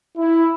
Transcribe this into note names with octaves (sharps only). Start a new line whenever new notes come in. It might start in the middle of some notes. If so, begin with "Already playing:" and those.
E4